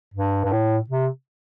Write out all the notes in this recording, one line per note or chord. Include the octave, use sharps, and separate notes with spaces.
G2
G2
A2
C3